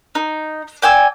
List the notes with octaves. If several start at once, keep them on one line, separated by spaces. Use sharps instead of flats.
D#4
D5 G5 G#5 E6